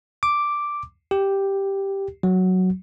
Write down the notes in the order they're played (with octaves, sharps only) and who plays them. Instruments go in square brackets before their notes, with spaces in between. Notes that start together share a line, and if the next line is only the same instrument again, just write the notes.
[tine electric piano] D6
G4
F#3